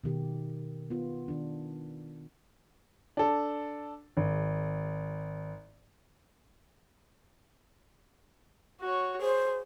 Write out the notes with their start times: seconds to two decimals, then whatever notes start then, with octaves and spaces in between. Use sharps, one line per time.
0.04 B2 D#3 G4
0.90 B3 F4
1.28 D#3 D4
3.17 D4 A4
4.17 G#1
8.81 F#4 C#5
9.21 G#4 C5